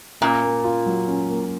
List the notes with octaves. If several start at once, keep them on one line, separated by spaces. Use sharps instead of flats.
A#2 C#4
A#3
F4
F#3
C#4
A#3